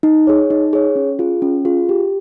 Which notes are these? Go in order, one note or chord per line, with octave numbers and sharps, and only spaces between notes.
D#4
G#4 C#5
D#4
G#4 C#5
C#4
F4 G#4
C#4
F4 G#4
G4